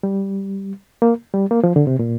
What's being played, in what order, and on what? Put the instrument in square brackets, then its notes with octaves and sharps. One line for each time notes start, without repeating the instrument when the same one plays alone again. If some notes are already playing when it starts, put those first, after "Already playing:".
[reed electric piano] G3
A#3
G3
A#3
F3
D3
C3
A#2